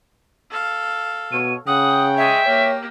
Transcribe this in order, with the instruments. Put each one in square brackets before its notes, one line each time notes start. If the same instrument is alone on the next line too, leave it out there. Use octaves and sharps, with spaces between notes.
[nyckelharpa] A4 F5
[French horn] B2 [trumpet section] C#5 [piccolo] D#7
[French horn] C#3 [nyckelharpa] F#5 [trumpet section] G5 [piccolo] D#6
[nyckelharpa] G#3 C#5 [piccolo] E5
[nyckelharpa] A#3 G4 [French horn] C#5